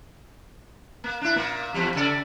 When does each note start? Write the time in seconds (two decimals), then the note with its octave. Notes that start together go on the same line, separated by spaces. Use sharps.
1.04 A#3
1.21 D4 E4
1.36 A#2 A#3
1.74 E2 F3 G3
1.95 C#3 A4 D5